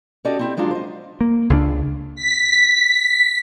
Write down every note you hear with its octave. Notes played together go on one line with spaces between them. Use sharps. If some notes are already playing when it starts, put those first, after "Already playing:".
C#4 F#4 G4 A4 D5 D#5
C4 E4 G4
F3 F#3 G#3 D4 F4
C5 D#5
A#3
C#2 C#3 D4
B6